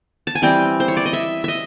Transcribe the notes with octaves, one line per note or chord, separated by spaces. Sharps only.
A5
G#5
E3 G3 C4 G5
C5
C#5
D5
D#5
E5
D#5 E5